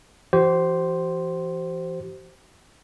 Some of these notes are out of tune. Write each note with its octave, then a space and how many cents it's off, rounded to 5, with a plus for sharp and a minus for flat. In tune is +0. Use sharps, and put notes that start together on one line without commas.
E3 +35 G4 -45 C5 +0